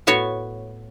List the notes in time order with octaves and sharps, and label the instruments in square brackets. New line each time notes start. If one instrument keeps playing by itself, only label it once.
[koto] A2 B3 F#4 C#5